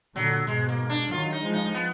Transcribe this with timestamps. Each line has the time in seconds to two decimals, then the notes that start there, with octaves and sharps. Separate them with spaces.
0.15 A#2 D3 F#3
0.47 G#2 B2 G#3
0.69 A#3
0.90 D4
1.11 D#3 F#3 F4
1.32 D#4
1.43 F3 G#3
1.53 D#4
1.74 B3